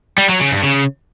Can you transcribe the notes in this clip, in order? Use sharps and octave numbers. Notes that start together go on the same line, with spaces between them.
G3
F#3
C#3
G2
C#3